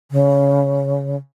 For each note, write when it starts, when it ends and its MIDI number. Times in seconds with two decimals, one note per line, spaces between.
0.12 1.17 49